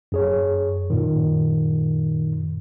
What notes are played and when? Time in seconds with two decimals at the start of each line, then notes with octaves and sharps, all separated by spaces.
0.12 F#2 G#4 C#5
0.90 F#2 A#2 D#3